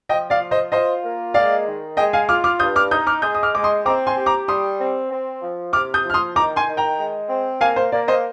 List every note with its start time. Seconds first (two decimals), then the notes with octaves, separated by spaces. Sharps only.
0.09 F3 D#5 G5
0.30 D5 F5
0.41 F4
0.51 C5 D#5
0.72 F4 C5 D#5
1.04 A#3
1.34 G#3 D5 F5
1.67 D#3
1.97 G#3 D#5 G5
2.13 F5 G#5
2.28 F4 D6 F6
2.44 D6 F6
2.59 G2 D#6 G6
2.76 D6 F6
2.91 D#4 D#6 G6
3.07 D6 F6
3.22 G#3 D#6 G6
3.35 D#6
3.43 D6 F6
3.54 G#3 D6
3.64 C6 D#6
3.86 C4 A#5 D6
4.07 G#5 C6
4.17 G4
4.26 A#5 D6
4.48 G3 C6 D#6
4.80 C4
5.11 C4
5.42 F3
5.73 C3 D6 F6
5.94 D#6 G6
6.04 F3
6.10 F6
6.14 C6 D#6
6.35 D#3 A#5 D6
6.56 G#5 C6
6.67 D#3
6.77 G5 A#5
6.99 G#3
7.29 C4
7.60 A#3 F5 G#5
7.76 C5
7.92 A#3 D5
8.08 C5 D#5